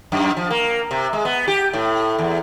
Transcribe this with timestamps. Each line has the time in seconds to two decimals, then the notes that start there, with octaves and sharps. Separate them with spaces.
0.12 F#2
0.37 F3
0.50 A#3
0.91 C3
1.13 G#3
1.25 B3
1.48 G4
1.73 A2
2.18 E2